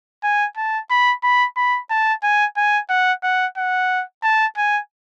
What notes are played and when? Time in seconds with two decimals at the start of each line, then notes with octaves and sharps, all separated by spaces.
0.23 G#5
0.57 A5
0.90 B5
1.23 B5
1.57 B5
1.90 A5
2.23 G#5
2.57 G#5
2.89 F#5
3.23 F#5
3.57 F#5
4.23 A5
4.57 G#5